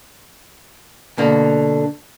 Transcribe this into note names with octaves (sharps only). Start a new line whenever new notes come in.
B2 D3 A#3